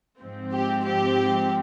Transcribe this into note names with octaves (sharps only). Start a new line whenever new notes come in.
G#2 F3 C4
G4
G4